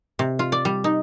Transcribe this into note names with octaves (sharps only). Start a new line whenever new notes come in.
C3
F4
D5
G3
D#4